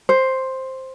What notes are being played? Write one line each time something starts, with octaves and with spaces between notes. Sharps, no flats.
C5